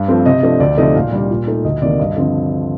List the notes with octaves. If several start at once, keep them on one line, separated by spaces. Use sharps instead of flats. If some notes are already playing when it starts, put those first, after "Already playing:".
Already playing: G2
F3 A3 C4
C3 D#5
F3 A3 D4
D2 D5
C3 F3 A3 D#4 D#5
A#2 F5
G3 D4
A#2
A3 D#4
D2 D#5
C3 D#3 A#3 D5
G2 D#5
D3 F3 C4